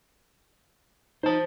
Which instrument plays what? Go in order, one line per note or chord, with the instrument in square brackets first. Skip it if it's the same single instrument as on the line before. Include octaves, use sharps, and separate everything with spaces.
[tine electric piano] D#4 [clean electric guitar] C5 A5